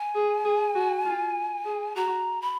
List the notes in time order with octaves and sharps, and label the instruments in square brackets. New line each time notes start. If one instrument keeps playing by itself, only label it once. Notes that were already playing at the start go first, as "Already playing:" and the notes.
Already playing: [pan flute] G#5
[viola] G#4
G#4
F#4
F4
G#4
[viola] F#4 [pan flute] A#5
[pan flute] B5